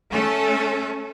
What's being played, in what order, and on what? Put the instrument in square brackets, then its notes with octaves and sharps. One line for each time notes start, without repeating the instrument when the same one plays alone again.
[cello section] A3 C#4 A4